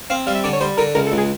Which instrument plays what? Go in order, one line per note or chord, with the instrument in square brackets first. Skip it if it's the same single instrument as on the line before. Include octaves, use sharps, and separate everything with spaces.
[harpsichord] C4 [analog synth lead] F5
[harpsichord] G3 [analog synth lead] F5
[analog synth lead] E5
[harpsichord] D3 [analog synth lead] D5
[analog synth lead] C#5
[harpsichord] G3 [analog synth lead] C5
[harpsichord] D3 [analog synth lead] A#4
[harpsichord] C#2 [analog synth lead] A#4
[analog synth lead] A4
[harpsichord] C#2
[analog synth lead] G#4